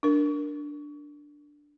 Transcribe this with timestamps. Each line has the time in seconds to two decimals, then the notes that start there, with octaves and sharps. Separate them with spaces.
0.03 D4 A#4